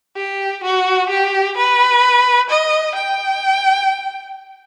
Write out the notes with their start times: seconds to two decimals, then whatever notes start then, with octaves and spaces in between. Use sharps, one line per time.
0.16 G4
0.64 F#4
1.10 G4
1.57 B4
2.50 D#5
2.96 G5